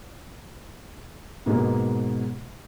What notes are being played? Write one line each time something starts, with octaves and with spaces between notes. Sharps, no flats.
G#2 B2 G#3 A#3 B3